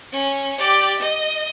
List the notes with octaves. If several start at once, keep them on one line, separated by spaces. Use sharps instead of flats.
C#4
G4 D5
D#5